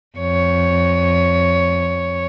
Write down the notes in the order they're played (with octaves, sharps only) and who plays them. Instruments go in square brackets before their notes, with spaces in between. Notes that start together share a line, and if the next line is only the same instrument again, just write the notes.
[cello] F2 C#5